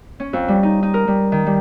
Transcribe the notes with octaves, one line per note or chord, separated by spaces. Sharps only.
C#4
F2
G3
D#4
D#4
A#4
G3
D#3
G3